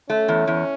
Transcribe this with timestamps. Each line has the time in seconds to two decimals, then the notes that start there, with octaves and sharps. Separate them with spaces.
0.09 A3 C#4
0.28 E2
0.47 E2